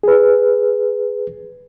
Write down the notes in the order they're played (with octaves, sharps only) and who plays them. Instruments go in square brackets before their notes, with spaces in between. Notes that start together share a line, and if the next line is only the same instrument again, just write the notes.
[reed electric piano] G#4 B4